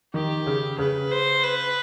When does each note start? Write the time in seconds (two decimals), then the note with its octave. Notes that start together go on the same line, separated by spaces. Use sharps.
0.14 D#3 G4
0.46 C#3
0.79 C#3 B4
1.11 C5
1.43 B4